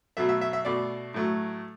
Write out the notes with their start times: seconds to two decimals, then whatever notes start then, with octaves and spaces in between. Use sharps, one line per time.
0.17 B2 F#3 A3 E5
0.29 E5
0.41 E5
0.53 E5
0.65 B2 A3 D5
1.14 A2 F#3 A3